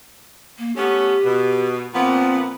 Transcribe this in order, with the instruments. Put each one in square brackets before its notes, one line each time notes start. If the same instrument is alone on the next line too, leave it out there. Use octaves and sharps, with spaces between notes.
[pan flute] A#3
[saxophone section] A3 B3 C#4 [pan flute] G4
[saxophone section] B2
[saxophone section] A#2 F3 B3 [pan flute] C4